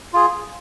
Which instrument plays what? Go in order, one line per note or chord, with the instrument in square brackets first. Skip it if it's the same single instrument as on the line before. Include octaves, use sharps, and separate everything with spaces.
[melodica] F4 G#4